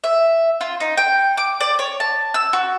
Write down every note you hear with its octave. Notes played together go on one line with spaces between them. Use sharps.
E5
F4
D#4
G5
D6
D5
C#5
A5
E6
F#4